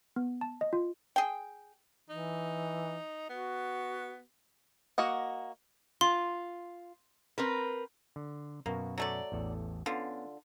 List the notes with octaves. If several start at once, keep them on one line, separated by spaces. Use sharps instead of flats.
B3
A5
D#5
F4
G#4 G5
E3 D#4
B3 F#4
A#3 F#4 D#5 F#5
F4 C6
C4 A#4 B4
D3
F#2 B2 A#3 F#4
F#3 A3 D5
A1 E2 A4
D3 B3 C#4 F4